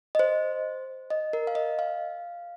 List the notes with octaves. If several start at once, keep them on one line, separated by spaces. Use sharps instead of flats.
D#5
C5
D#5
A#4
F5
D#5
F5